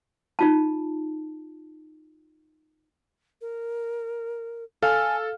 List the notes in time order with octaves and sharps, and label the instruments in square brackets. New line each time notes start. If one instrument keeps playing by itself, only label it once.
[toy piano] D#4 F4 A5
[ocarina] A#4
[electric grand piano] A4 [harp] F5 [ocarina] G#5